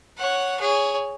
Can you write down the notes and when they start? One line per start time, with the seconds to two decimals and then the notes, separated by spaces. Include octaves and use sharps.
0.18 C#5 F#5
0.59 G#4 C#5